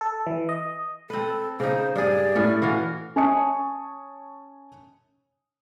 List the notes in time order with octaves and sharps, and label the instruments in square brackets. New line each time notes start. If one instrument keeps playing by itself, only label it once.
[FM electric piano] A4
E3
D#5
[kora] C4 B4 [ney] A4
[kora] C#3 D#4 [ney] C5
[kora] G2 G#4 [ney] D5
[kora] A2 C#4 B4
E3 F#4 F5
[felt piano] C#4 G#5 A5 C#6 D#6 C#7